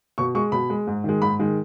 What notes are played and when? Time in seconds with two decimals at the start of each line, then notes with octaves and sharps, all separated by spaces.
0.18 B2 C#6
0.35 G#3 C#6
0.52 B2 B5
0.70 G#3
0.87 G#2
1.04 D#3 G#3
1.22 G#2 B5
1.39 D#3 G#3